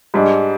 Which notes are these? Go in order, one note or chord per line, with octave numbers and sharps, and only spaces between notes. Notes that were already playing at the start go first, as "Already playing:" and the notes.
G#2 G3 D4